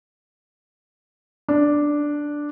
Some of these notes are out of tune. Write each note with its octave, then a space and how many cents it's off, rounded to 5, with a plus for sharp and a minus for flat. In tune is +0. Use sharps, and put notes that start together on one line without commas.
D4 +0